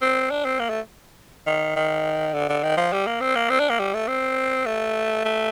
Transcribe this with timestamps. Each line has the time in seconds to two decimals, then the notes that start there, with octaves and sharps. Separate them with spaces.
0.02 C4
0.31 D4
0.45 C4
0.60 A#3
0.70 A3
1.47 D#3
1.76 D#3
2.34 D3
2.49 D3
2.63 D#3
2.77 F3
2.92 G3
3.07 A#3
3.21 C4
3.36 A#3
3.50 C4
3.60 D4
3.70 A#3
3.79 G3
3.94 A3
4.08 C4
4.66 A3
5.25 A3